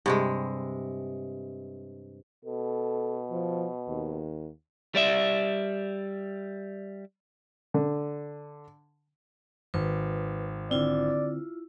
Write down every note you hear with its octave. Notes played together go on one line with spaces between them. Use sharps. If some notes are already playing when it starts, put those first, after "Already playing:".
G2 C3 G#3
B2 A4
F3
D#2
G3 D5 E5
D3
G#1 B4
D3 C4 E4 F4 D5